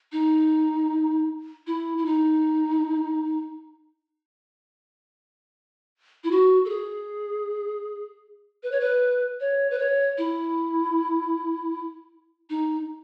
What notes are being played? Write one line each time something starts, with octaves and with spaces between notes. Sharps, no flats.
D#4
E4
E4
D#4
E4
F#4
A4
G#4
B4
C#5
B4
C#5
B4
C#5
E4
D#4